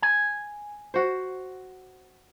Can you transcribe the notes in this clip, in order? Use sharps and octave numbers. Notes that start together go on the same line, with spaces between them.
G#5
F#4 C5